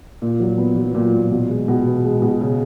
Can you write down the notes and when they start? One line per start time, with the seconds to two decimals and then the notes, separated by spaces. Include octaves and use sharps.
0.22 A#2
0.40 F#3
0.58 B3
0.76 F#3
0.94 A#2
1.13 A#2
1.31 B2
1.49 G#3
1.68 B2
1.86 B3
2.05 G#3
2.22 B2
2.41 C#3